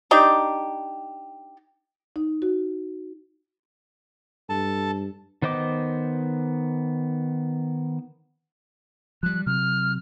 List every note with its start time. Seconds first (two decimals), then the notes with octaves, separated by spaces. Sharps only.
0.11 D4 D#4 G4
2.16 D#4
2.42 F#4
4.49 G2 A4 A5
5.42 D#3 B3 C5 D#5 D6
9.23 F3 G3 F#6
9.46 C3 F#3 F6